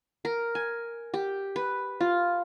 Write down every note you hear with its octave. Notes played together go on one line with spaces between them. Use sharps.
A#4
G#5
G4
B4
F4